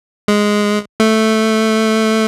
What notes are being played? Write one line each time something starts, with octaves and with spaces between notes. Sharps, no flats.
G#3
A3